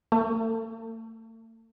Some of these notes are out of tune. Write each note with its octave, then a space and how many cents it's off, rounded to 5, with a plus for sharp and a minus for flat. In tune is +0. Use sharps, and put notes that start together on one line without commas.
A3 +45